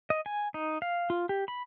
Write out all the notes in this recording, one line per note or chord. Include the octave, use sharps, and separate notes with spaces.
D#5
G#5
D#4
F5
F4
G4
B5